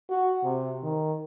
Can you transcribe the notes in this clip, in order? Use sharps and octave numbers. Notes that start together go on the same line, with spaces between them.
F#4
C3
D#3